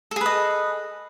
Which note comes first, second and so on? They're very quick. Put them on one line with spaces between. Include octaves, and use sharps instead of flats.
A4 G#4 B4 D#5